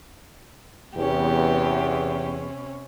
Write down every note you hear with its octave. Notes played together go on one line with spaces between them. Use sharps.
E2 C3 C#4 G4